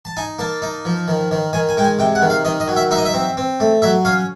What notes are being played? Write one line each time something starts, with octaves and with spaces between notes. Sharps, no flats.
A5
D#4 G#5
A#3 A5
D#4
F3
D#3
D#3
D#3 G#5
G#5
G#3 G5
G#5
C3 G5
F#5
D#3
F5
D#3 D#5
D#5
F#3
E5
D#4 E5
D#5
E5
C4
C4
A3
F#3 E5
C#4 F5